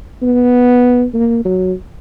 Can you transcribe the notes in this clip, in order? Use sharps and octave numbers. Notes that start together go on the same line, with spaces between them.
B3
A#3
F#3